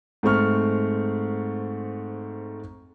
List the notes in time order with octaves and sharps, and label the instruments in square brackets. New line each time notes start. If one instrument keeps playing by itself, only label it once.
[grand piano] G#2 A3 C4 C#6 F6